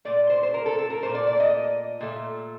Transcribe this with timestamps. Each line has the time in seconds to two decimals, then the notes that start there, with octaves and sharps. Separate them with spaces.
0.05 A#2 A3 D5
0.30 C5
0.43 C5
0.54 A#4
0.66 A4
0.78 A4
0.90 A#4
1.02 A#2 A3 C5
1.15 D5
1.27 D5
1.40 D#5
2.01 A#2 A3